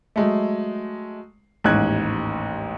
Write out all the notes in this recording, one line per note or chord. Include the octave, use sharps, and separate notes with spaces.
F#3 G#3 A3
A1 D#2 G#2 F#6 G#6